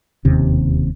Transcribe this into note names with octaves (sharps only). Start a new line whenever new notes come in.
E1 D#2 C3 C#4